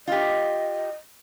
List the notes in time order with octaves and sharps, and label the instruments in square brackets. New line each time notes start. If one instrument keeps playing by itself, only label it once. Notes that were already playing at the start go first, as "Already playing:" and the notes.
[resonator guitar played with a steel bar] F4 G4 [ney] D#5